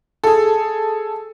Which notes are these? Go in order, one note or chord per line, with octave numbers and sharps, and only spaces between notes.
G#4 A4